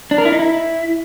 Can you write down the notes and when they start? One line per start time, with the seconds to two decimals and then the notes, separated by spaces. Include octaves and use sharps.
0.11 D4
0.18 A#4
0.25 E4
0.32 D#4
0.39 E4